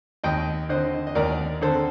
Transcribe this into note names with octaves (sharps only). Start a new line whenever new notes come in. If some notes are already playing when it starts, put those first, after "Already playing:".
D#2 D#5 G5
D3 C5 D#5
D#5
D#2 A#4 D5
D3 A4 C5